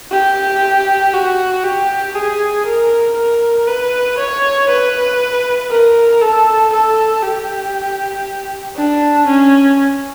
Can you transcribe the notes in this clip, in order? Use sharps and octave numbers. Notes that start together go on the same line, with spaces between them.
G4
F#4
G4
G#4
A#4
A#4
B4
C#5
B4
A#4
A4
A4
G4
D4
C#4